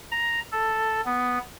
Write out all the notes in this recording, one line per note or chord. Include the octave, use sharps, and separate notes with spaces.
A#5
A4
B3